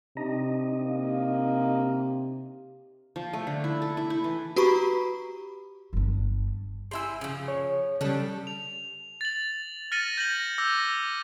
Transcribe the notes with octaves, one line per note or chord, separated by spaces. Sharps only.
C3 D4 D#4 D#5
A#3
F3
A3
D3
E4
A4
E4
E4
E3
F#4 G4 B4 A#5 B5 C#6
G1 D4
G3 E4 G#5 C6 E6
C#3 F3
C#5
C#3 G3 D4 G4 A4
F7
A6 F#7
F6 A6 A#6 C#7 D#7 F#7
G6 A#6 F#7
D6 E6 G6 A#6